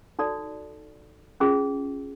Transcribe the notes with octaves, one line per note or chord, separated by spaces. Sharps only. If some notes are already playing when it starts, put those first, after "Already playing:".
D#4 F#4 A4 D5
C#4 F4 G#4